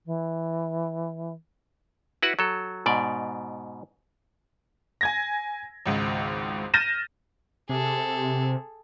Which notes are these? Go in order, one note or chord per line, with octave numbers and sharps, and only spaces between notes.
E3
E4 F#4 B4 F#5
F#3 A4
G#2 B2 D5
G#5 G#6 A#6
G#1 C#2 G#2
F6 G6 A6 A#6 D#7 E7
C3 G#4 A4